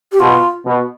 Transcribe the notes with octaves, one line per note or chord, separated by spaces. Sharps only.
G4
B2 F4
B2